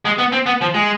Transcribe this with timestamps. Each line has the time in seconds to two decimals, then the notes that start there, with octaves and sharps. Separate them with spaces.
0.05 G#3
0.18 B3
0.32 C4
0.46 B3
0.61 F3
0.74 G#3